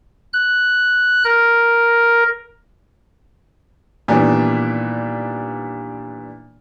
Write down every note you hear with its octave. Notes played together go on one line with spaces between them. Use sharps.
F#6
A#4
A#2 D#3 E3 G3 B3 D4